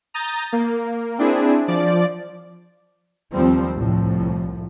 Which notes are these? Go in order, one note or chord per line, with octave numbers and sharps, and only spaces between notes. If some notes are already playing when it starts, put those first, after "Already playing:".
A#5 D#6 G6 A6
A#3
C4 D4 E4 G#4
F3 D5
D#2 F3 G3 C4
C2 A2 F3